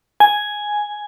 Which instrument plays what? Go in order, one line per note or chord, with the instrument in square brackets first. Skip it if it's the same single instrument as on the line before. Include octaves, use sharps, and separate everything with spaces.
[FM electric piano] G#5